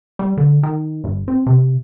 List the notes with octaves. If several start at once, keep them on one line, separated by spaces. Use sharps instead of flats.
G3
D3
D#3
G1
C4
C3